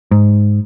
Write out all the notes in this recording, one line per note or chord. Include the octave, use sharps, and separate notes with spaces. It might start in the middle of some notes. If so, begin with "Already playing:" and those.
G#2